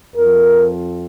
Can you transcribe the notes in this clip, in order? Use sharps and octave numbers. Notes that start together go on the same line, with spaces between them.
F2 F3 A#4